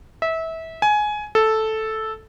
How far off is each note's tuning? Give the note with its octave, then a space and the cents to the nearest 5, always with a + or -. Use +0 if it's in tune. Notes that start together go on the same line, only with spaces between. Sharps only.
E5 -25
G#5 +15
A4 -5